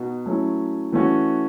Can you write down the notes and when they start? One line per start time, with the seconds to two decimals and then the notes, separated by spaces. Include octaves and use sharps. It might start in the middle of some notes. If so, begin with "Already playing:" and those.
Already playing: B2 D#4 F#4
0.26 F#3 A3 C#4 E4
0.92 E3 A3 C#4 F#4